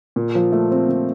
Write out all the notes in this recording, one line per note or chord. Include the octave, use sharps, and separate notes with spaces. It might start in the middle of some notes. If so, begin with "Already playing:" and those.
A#2
F3
A3
C4
A#2